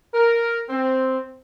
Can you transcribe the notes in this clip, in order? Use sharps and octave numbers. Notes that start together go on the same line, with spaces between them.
A#4
C4